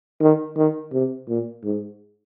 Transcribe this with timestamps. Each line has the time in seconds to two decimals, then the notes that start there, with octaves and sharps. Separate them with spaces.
0.21 D#3
0.57 D#3
0.93 C3
1.29 A#2
1.64 G#2